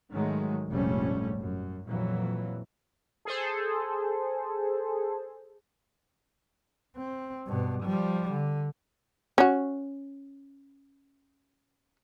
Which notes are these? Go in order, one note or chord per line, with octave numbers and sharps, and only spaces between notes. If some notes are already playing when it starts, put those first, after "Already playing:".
G#2 D#3 F#3 G#3 A3
F1 A#1 G#2 G3 A3 C#4
F#2
F2 A#2 E3 F#3
G#4 A4 C5
C4
G2 B2
F3 G3
D3
C#4 F#4